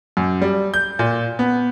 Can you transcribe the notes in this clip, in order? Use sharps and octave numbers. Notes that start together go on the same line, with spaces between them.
F#2
G3
G6
A#2
B3